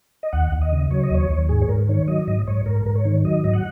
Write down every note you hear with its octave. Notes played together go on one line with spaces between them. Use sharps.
D#5
D#2 F#5
D#2
D#5
C#3
F#3 C#5
D#5
D#2 C#5
D#2
G#2 G#4
C#5
G#2 A#4
D#3 C#5
F#3 D#5
G#2 D#5
G#2 C#5
G#2 A#4
G#2 A#4
C#5
D#3
F#3 D#5
G#2 D#5
F#5